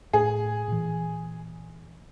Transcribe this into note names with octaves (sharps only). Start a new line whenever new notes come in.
A2 G#4
A#2 E3